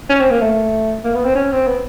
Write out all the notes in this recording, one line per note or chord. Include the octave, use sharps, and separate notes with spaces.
C#4
C4
A#3
A3
A#3
B3
C4
C#4
C4
B3